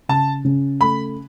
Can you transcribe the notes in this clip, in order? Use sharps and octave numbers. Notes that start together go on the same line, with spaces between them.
C#3 A5
C#3
A3 B5